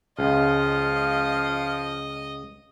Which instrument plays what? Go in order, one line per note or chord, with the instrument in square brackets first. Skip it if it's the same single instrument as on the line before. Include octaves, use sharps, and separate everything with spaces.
[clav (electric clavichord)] C#2 [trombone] F3 [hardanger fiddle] D#5 [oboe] F5